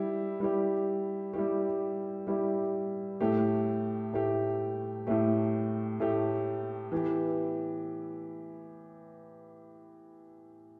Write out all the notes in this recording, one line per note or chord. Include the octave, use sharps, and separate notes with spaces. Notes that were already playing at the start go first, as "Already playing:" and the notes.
Already playing: G3 E4 G4
G3 E4 G4
G3 E4 G4
G3 E4 G4
A2 A3 G4
A2 A3 G4
A2 A3 G4
A2 A3 G4
E3 B3 G4